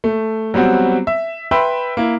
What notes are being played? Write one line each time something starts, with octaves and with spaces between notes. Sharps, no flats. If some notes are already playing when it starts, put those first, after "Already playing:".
A3
F#3 G3 B3 C4 F#4
E5
B4 E5 G5 B5 C6
A#3 E4